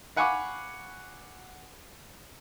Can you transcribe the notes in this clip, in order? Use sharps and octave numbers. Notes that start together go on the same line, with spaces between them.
F5 F#5 G#5 B5 C#6 D6